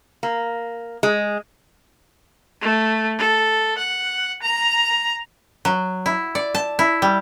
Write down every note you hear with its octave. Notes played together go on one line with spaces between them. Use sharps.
A#3
G#3
A3
A4
F#5
A#5
F#3
E4
D5
A5
E4
G3